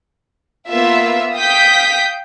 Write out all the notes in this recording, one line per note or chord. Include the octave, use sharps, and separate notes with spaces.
A#3 B3 F4 E5
F5 G5 D#6 G6 B6